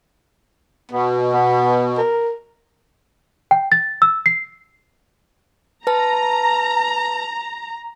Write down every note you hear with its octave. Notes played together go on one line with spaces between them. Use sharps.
B2 B3
B3
A#4
G5
A6
E6
C7
B4 A5 A#5